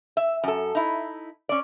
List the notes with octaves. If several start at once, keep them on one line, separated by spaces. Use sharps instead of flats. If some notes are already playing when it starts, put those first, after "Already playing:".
E5
F#2 A4
D#4 E4
C#4 D5